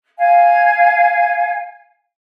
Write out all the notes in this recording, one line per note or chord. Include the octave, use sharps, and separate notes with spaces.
F5 G#5